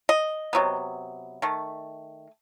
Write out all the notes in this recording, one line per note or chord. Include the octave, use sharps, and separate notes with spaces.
D#5
C3 F#3 B3
D#3 A3